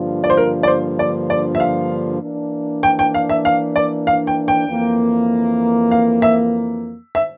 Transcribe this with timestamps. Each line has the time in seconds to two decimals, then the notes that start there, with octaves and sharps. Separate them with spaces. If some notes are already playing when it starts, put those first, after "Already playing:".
Already playing: G2 D3 F3 A#3 F4
0.24 D5
0.30 C5
0.37 A#4
0.63 D5
0.68 C5
0.99 D5
1.30 D5
1.55 E5
1.60 F5
2.22 E3 A#3 D4
2.83 G5
2.99 G5
3.14 F5
3.29 E5
3.45 F5
3.76 D5
4.07 F5
4.27 G5
4.48 G5
4.68 F2 E3 A#3
5.91 F5
6.22 E5
7.15 E5